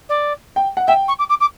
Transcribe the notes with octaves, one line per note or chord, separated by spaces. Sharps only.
D5
G5
F#5
E5 G5
C#6
D6
D6
D6